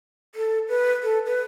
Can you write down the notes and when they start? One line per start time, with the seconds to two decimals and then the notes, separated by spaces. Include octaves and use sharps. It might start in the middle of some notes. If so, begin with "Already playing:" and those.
0.35 A4
0.69 B4
1.03 A4
1.26 B4